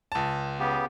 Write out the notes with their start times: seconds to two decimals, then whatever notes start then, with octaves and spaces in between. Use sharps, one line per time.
0.12 C#2 A5
0.59 C#3 B3 G4